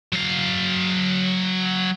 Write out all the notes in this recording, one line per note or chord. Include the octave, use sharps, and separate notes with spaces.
F#3 F5